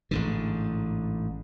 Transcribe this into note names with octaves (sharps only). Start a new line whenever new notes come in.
A1 G#2 D3